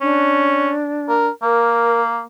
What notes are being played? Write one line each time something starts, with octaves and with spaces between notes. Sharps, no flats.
C#4 D4
A#4
A#3 A#4